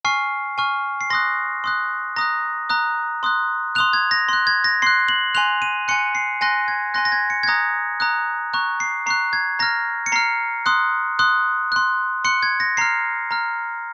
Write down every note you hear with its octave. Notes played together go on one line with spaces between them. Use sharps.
G#5 C#6 F6 C7
G#5 C#6 F6
C7
C6 D#6 F#6 A#6
C6 D#6 F#6
A#5 D#6 F#6 A#6
A#5 D#6 F#6
C6 D#6 F#6
C6 D#6 F#6 F7
G#6
A#6
C6 F#6
G#6
A#6
C6 F#6 C7
F#7
G#5 C6 F#6 F7
D#7
G#5 C6 F#6 C#7
C7
G#5 C6 F#6 A#6
G#6
G#5 C6 F#6 A#6
A#6
G#6
C#7
G#6
A#5 D#6 F#6 A#6
A#5 D#6 F#6
A#5 C#6 F#6
C7
A#5 C#6 F#6 C7
G#6
A#5 F6 A#6
C#7
A#5 F6 C7
C6 D#6 F#6
C6 D#6 F#6
C6 F#6
C6 F#6 C#7
G#6
A#6
A#5 F6 C7
A#5 F6